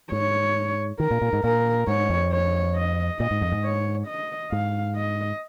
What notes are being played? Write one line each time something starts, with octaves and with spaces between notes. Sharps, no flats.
G#2 C#5
D#3 A#4
A#2
A#2
G#2
A#2 A#4
G#2 C#5
F2
C#5
D#5
A#2 D#5
G#2
F2
G#2
C#5
D#5
G#2 F5
D#5